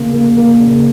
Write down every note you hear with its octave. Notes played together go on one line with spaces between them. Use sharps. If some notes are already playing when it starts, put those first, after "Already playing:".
Already playing: C#3 A#3
A#3
A#3
C#3